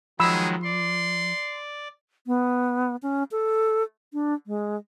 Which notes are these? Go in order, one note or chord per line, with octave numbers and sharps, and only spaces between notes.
D#3 F3 F#3 G#3 G#4 B5 E6
D5 C6
B3
C#4
A4
D4
G#3